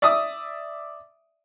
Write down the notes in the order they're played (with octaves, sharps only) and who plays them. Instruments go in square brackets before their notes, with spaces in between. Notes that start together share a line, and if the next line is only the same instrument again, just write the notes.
[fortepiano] D5 E5 D6 D#6